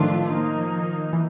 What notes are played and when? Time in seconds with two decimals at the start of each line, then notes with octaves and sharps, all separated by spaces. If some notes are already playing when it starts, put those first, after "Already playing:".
Already playing: A2 D#3 F3 A3 D4 F4
0.31 F3 A#3 D#4
1.13 E3